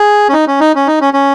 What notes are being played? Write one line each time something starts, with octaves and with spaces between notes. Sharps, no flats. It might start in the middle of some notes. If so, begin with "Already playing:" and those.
Already playing: G#4
C#4
D#4
C#4
D#4
C#4
D#4
C#4
C#4